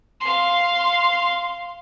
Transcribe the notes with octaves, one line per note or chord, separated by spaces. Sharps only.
F5 C6